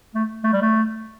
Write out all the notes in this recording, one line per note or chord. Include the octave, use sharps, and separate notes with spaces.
A3
A3
G3
A3